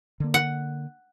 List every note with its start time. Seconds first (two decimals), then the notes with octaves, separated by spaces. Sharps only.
0.20 D3 A#3
0.34 F#5